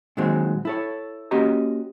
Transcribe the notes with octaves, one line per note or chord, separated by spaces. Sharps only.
A#2 D#3 F#3 G#3 C4
E4 A4 C#5
A#3 C#4 F#4 G4 D#5 A#5